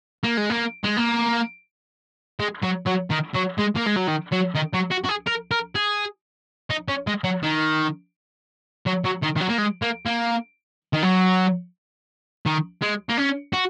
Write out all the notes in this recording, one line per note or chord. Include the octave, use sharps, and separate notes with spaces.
A#3
G#3
A#3
G#3
A#3
G#3
F#3
F#3
D#3
F#3
G#3
A#3
G#3
F#3
D#3
F#3
D#3
F#3
F#4
F#4
G#4
A#4
A#4
G#4
D#4
C#4
G#3
F#3
D#3
F#3
F#3
D#3
D#3
F#3
A#3
G#3
A#3
A#3
D#3
F#3
D#3
G#3
A#3
C#4
F#4